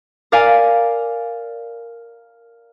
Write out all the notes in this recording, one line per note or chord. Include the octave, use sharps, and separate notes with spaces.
A#4 D5 F5 G#5 A#5